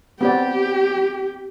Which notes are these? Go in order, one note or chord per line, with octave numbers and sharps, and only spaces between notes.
B3 C4 G4 D5